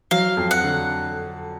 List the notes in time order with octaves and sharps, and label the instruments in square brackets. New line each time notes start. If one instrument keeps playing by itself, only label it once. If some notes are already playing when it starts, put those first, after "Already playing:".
[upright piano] F#3 [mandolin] F5
[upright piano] F2
[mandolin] F#5
[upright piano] D3